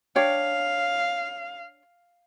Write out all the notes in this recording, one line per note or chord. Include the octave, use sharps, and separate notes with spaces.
D4 C#5 F5 G5